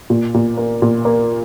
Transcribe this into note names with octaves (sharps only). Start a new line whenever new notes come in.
A#2
A#2
A#3
A#2
A#3